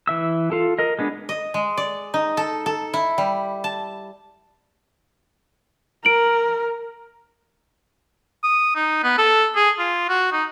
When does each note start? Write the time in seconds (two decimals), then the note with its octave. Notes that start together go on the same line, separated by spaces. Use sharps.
0.07 E3 E5 E6
0.52 F4 A4
0.79 A#4 D#5
0.99 G#3 B3 D4
1.29 D#5
1.54 G#3
1.77 D5
2.14 D#4
2.37 A4
2.66 A4
2.94 E4
3.18 G3
3.64 A5
6.05 A#4 D7 F#7
8.44 D#6
8.76 D#4
9.04 B3
9.18 A4
9.56 G#4
9.79 F4
10.09 F#4
10.33 D#4